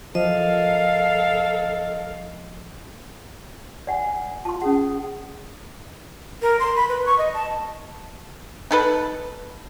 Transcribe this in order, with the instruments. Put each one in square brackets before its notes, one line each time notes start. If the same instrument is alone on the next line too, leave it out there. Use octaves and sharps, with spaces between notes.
[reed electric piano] F3 [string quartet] A4 A#4 F5 [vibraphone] D#5
[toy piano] D5 F#5 G#5
[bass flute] F4 [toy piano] A5 C6
[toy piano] C#4 F#5 [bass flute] G#4
[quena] A#4
C6
B5
B4
C#6
D#5
A5
[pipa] D#4 A4 B4